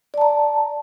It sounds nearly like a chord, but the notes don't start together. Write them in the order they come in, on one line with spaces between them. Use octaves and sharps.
D5 A5 A#5